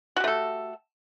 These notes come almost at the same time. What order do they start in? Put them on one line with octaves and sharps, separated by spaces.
F#4 G4 A3 A4